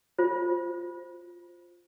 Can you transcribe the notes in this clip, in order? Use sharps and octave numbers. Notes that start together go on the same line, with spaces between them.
F4 C5